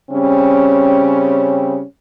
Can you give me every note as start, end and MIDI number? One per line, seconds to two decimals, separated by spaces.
0.10 1.82 49
0.10 1.82 55
0.10 1.82 60
0.10 1.82 61